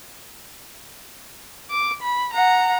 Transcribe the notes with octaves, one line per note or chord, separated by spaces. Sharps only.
D6
B5
F#5 A#5